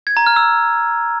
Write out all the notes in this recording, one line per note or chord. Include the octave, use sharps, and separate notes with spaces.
G#6
A#5
F6
E6